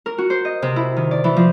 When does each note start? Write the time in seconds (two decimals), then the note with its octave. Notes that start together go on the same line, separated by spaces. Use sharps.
0.06 A#4
0.18 F#4
0.30 C5
0.45 D#5
0.62 C3
0.76 E4
0.97 D#3
1.11 D5
1.24 E3
1.36 F3